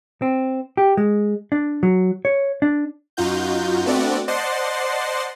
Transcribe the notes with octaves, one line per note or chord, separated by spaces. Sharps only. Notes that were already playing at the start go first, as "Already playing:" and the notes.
C4
G4
G#3
D4
F#3
C#5
D4
F#2 D#4 F4 F#4 G6
A3 B3 C4 D4 F#4 D5
C5 D5 D#5 F#5 A5 C6